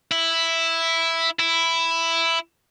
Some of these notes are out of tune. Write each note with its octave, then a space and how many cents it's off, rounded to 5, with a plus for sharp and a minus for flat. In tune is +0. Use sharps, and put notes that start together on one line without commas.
E4 +0
E4 +5